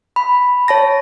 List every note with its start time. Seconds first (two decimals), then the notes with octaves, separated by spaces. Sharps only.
0.16 B5
0.68 C#5 A5 A#6